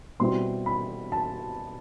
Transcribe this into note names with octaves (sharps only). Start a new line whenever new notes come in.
B2 G3 C4 E4 C6
B5
A5